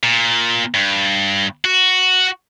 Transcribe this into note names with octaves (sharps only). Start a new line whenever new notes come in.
A#2
G2
F#4